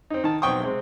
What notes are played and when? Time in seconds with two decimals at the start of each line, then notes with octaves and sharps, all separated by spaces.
0.10 C4 D#4
0.24 D#3 A5
0.42 B1 C4 G5 C#6 D#6
0.60 C3 G#3 C4